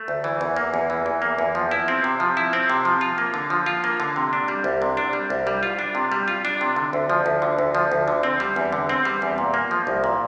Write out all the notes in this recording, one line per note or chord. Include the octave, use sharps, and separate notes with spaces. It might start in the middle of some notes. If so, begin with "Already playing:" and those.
Already playing: A3
D2
E3
E2
A#3
E2
E3
E2
A#3
E2
F3
E4
C4
C3
F3
E4
C4
C3
F3
F4
A#3
D3
F3
F4
A#3
D3
C3
D4
G3
C2
C3
D4
G3
C2
G3
F4
D4
C3
G3
F4
D4
C3
D3
D2
F3
D2
D3
D2
F3
D2
D3
C4
G3
E2
D3
C4
G3
E2
A#2
A#3
F3
C2
A#2